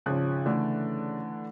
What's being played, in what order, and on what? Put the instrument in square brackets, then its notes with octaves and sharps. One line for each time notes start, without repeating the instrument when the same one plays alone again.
[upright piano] G#1 F3 F#6 [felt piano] C#3
[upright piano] D3 E3 D5 [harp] A3